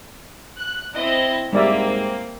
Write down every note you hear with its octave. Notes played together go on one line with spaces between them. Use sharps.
F#6
C4 E4 D#5
G#2 G3 A#3 C4 D5 E5